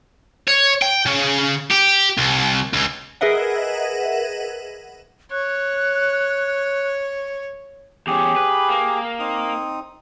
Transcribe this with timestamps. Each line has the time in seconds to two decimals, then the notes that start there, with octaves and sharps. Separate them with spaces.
0.48 C#5
0.82 G5
1.06 C#3
1.71 G4
2.18 C2
2.74 C#2
3.21 G#4 A#4 B4 D#5 E5 F#5
5.32 C#5 F#6
8.07 E2 C#4 G4 G#4
8.36 B4
8.69 A#3
9.19 C4 D#4 D#6